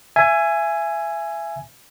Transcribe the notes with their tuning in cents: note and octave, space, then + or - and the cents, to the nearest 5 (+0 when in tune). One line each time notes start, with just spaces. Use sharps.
E5 +30 G#5 +0